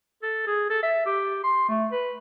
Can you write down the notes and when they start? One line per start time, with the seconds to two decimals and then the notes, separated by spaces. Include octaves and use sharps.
0.23 A4
0.47 G#4
0.70 A4
0.83 E5
1.06 G4
1.44 C6
1.69 A3
1.92 B4